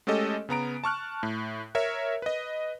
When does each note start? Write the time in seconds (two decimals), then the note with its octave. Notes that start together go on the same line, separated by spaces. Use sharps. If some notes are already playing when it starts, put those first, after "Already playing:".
0.07 G#3 A3 C#4 G4 A4 D#5
0.49 C#3 B3 A#5 D7
0.84 A5 C#6 F6 F#6
1.23 A2
1.75 A#4 C#5 E5
2.22 B4 D#5